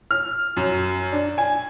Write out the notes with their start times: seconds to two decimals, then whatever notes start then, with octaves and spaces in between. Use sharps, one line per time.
0.11 F6
0.57 F#2
1.12 D4
1.38 G#5